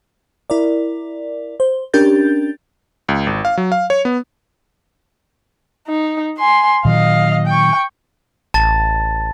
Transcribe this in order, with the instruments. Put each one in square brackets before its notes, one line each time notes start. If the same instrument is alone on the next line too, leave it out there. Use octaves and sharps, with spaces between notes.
[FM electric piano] E4 A#4 D5
C5
C#4 D4 G4 A#4 G6 A6
[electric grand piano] C#2
G#1
F5
F#3
F5
C#5
B3
[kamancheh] D#4
G#5 C6
[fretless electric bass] A#2 D#3 F#3 [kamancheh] D#5 F5
[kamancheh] G5 C#6
[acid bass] A1 [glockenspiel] A5 A6